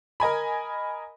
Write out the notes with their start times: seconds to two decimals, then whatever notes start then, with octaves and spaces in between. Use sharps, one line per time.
0.20 A#4 D#5 G#5 B5